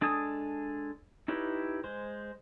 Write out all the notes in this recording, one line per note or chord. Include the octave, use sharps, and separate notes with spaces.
G#3 D4 A4 G#5 D#6
D#4 E4 G4 B4 C#5
G#3 C5